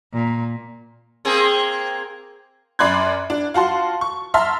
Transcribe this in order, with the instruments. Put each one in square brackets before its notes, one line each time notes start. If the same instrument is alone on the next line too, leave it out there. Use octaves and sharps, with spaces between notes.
[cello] A#2
[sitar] A#3 C4 G#4
[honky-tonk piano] F#2 D5 B5 C6 F#6 G#6
D4
F4 F#4 A5 C6
C#6
E5 A5 A#5 C6 F6